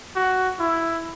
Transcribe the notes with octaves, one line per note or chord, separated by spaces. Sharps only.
F#4
E4